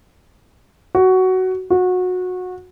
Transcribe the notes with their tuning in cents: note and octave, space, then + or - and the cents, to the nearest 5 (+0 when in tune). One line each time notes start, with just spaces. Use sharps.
F#4 +10
F#4 -25